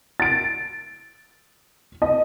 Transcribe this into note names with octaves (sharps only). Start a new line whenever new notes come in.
A6 D7
D#5